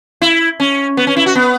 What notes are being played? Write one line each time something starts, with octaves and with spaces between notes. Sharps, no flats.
E4
C#4
B3
C#4
E4
F#4
B3